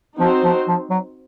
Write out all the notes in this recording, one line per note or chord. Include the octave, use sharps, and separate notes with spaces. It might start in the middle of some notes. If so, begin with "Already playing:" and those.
F3 C4 D#4 F#4 C5
F3
F3
F#3